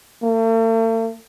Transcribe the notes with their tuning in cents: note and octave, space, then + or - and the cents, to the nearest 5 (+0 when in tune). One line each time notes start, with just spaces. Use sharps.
A3 +45